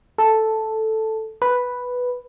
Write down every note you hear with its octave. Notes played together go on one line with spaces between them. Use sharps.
A4
B4